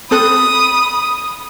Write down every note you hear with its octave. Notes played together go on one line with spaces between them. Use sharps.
C4 A4 B5 D#6 F#6